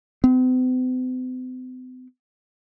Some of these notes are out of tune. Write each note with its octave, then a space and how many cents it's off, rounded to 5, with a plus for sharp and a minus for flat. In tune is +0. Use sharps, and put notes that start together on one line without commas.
C4 -45